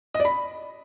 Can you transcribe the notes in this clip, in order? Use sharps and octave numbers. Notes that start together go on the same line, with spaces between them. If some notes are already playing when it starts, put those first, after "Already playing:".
D#5
D5
B5